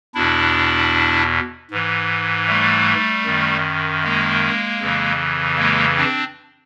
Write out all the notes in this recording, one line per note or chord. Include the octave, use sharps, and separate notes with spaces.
E2 B2 D4 E4
G#2 E3
G3 A3
F#2 D#3
G#3 A#3
F2 C#3 E3
G#3 A#3
C4 D4